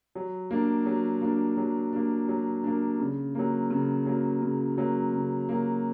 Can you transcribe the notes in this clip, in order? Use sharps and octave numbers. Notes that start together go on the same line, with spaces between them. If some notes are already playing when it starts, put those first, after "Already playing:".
F#3
A#3 D4
F#3
A#3 D4
F#3
A#3 D4
F#3
A#3 D4
C#3
F#3 A#3
C#3
F#3 A#3
C#3
F#3 A#3
C#3
F#3 A#3